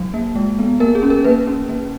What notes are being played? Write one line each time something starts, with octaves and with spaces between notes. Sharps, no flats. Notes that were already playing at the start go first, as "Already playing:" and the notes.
Already playing: F#3
A#3
G#3
B3
A#3 A#4
G#4
C#4
A#4
A#3 B4
C#4
A#3